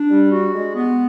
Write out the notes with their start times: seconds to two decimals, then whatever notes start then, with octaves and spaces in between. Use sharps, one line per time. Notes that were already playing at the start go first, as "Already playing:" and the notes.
Already playing: D4
0.10 G3
0.32 F#4
0.54 G#3
0.75 B3